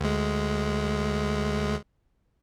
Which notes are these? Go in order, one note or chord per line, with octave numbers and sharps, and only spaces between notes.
D2 G#3